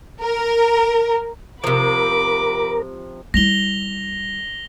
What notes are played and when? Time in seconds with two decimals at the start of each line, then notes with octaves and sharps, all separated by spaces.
0.23 A#4
1.64 C3 F3 A#4 B5 D6
3.34 G3 E4 A#6 F7 G7